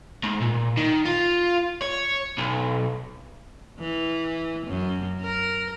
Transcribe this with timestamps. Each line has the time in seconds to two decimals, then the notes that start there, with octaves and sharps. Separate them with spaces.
0.23 G#2
0.41 A#2
0.77 D#3
1.05 F4
1.82 C#5
2.38 B1
3.79 E3
4.66 F#2
5.21 A#4